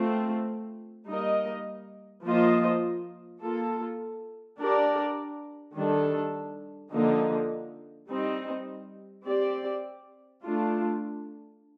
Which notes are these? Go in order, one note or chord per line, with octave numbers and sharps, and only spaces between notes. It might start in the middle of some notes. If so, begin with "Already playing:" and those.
Already playing: A3 C4 F4
G3 A#3 D#4 A#4 D#5
F3 A#3 F4 C5 D#5
A#3 F4 A4
D4 G4 A#4 D5
D#3 G3 D4 A4
D3 F3 A#3 D#4
G3 C4 D#4
C4 G4 D5
A3 D4 F4